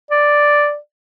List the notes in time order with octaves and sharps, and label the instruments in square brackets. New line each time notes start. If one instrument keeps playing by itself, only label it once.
[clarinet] D5